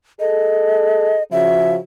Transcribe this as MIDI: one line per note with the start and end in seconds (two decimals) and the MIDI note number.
0.20 1.19 68
0.20 1.19 69
0.20 1.23 75
1.32 1.78 49
1.32 1.78 53
1.32 1.78 66
1.32 1.73 76